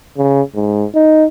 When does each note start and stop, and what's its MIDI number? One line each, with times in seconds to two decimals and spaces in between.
0.18 0.42 49
0.55 0.85 44
0.95 1.25 63